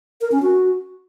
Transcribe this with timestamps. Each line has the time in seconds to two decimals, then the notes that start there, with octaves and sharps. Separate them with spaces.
0.21 A#4
0.32 C#4
0.42 F#4